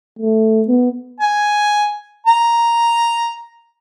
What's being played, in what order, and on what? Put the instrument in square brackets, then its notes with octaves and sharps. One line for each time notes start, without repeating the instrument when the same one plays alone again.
[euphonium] A3
B3
[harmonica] G#5
A#5